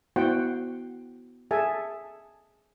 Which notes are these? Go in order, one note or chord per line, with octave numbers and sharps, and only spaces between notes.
B3 E4 F#4 C5 F#5 G5
G#4 A4 E5 G#5 A5